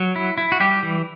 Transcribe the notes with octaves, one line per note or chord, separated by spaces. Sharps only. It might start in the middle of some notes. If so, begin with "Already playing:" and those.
Already playing: F#3
E4
E4
F#4
G3 G4
E3